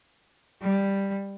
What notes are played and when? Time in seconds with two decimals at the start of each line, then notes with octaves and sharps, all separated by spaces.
0.62 G3